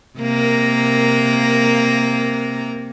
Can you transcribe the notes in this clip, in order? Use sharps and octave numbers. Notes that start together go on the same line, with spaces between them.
C3 A#3 A#4